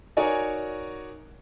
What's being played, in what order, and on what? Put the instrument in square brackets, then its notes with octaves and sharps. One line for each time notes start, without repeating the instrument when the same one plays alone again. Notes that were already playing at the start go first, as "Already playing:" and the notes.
[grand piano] D#4 F#4 A#4 C#5 D5 G#5